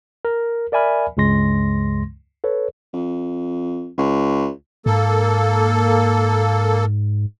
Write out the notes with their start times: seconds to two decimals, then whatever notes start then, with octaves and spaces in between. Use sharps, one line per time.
0.25 A#4
0.72 A#4 D5 E5 G#5 B5 F6
1.17 C#2 G2 C#3 G#3 C6 A#6
2.44 A4 B4 C#5
2.93 F2
3.98 C#2
4.86 G#2 A#3 A4